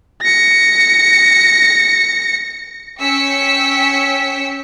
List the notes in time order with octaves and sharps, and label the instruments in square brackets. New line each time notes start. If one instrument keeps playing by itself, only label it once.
[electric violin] A#6 C#7
[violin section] C#4 G5 E6 B6 C#7